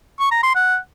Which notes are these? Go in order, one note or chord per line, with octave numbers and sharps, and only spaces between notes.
C#6
A#5
C6
F#5